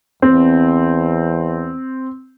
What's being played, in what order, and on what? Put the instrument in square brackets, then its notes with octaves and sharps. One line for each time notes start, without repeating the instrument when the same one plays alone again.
[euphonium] E2 [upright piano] C4